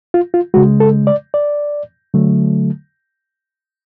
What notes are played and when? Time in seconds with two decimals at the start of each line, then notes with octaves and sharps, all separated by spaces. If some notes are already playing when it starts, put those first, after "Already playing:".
0.14 F4
0.34 F4
0.54 C#3 G#3 F#4
0.80 A4
1.07 D5
1.34 D5
2.14 D3 F#3 A3